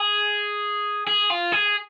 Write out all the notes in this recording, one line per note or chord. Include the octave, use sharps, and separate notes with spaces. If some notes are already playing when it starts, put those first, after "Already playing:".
Already playing: G#4
G#4
F4
G#4